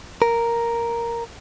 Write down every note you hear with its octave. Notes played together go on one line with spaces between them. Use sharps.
A#4